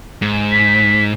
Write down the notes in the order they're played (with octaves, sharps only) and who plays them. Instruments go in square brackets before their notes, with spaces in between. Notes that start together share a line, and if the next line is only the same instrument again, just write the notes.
[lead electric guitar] G#2
[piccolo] B6